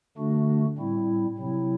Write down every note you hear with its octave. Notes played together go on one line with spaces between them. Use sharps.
D3 A3 D4 F#4
A2 G3 C4 E4
C3 F#3 C4 E4